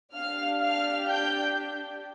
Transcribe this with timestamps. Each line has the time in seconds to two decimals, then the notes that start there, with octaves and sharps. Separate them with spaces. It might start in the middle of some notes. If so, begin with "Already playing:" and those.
0.15 D4 G4 F5 F6
0.62 F5 F6
1.08 G5 G6